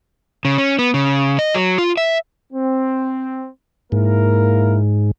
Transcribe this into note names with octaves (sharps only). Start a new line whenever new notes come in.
C#3
C#4
B3
C#3
D#5
F#3
F4
E5
C4
G#2 A#3 E4 A#4